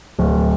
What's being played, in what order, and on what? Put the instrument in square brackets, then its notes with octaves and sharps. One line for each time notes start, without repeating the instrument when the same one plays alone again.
[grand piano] D1